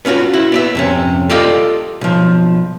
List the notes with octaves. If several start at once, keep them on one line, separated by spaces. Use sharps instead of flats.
B3 C#4 D#4 F4 F#4
E4 F#4
B3 D5 E5
F2 C3 C#4
F4 G4 A4 D5 D#5 F5
B1 F3